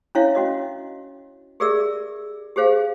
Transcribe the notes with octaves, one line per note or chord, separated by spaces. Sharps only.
C#4 D4 E4 C#5 E5 F5
C#4 F#4 D#5
G4 G#4 A#4 D5 E5 E6
G4 G#4 C5 F5